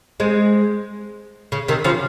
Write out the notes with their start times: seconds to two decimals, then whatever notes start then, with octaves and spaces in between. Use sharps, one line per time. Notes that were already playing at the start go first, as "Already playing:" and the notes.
0.20 G#3 C4
1.52 C#3
1.68 C3 D#3
1.84 C#3 F3